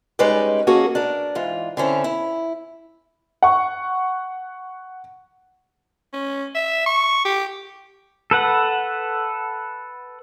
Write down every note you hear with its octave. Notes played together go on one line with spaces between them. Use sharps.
G3 G#3 C#4 D#4 B4 D5
A#3 C#4 F#4 G#4 A4
D4 A#4
G#2 E3 F4
D3 C4 C#4 E4
E4
F#5 C#6
C#4
E5
C#6
G4
A4 B4 F#5